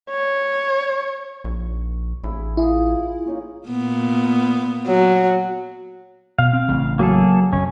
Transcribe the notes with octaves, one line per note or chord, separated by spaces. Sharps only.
C#5
A#1 C#6
A1 E4 G#4
E4 F4 G#4 A#4
A#3 C#4 D#4
A#2 B3
F#3
B2 F5
C4
A1 C#3
F#3 A#3 G#4 A4
F#1 C#4